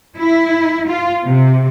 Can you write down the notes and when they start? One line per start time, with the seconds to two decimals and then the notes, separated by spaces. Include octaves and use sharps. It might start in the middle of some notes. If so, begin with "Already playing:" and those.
0.18 E4
0.88 F4
1.26 C3